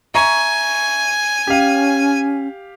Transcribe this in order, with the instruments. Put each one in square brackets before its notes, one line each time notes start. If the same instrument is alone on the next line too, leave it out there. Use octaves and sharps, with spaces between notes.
[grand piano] E5 A#5 C#6 [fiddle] G#5
[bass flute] C#4 [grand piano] G4 F5